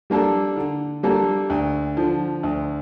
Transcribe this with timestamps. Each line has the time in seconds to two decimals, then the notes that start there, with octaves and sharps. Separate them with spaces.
0.10 G3 A#3 D4 A4
0.57 D3
1.03 G3 A#3 D4 A4
1.50 D2
1.97 D3 F3
2.43 D2